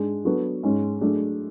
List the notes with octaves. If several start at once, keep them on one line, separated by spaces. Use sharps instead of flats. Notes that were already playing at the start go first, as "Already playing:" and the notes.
Already playing: G#2 G#3 D4 G#4
F#3 B3 D4 F#4 A4
G#2 G#3 C#4
F#3 A3 D4 G#4